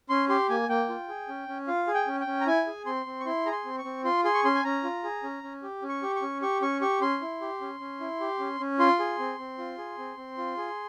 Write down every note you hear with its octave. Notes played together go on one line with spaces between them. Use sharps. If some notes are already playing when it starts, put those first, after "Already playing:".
C#4 C6
G4 C6
A#3 G#5
A#3 G5
F4
G#4
C#4
C#4
F4 F5
G#4
G5
C#4
G5
C#4
A#5
E4 G#5
G#4
C4 C6
C4
C#6
E4 C6
G#4 A#5
C6
C4
C#6
C4
F4 C6
G#4 C6
C#6
C#4 C6
G#5
C#4 A#5
F4
G#4
C#4
C#4
G4
C#4
C#6
G4
C#6
C#4
G4 C#6
C#4 C#6
G4 C#6
C#4 C6
E4
G4
C#4
C#4
E4
G4
C#4
C#4
F4 C6
G#4
C4
C4
F4
G#4
C4
C4
F4
G#4